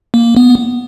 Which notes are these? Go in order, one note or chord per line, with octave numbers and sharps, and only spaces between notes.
A#3
B3